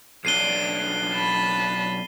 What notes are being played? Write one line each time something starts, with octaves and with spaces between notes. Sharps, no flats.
B1 D4 C7 D#7 G7
A5 B5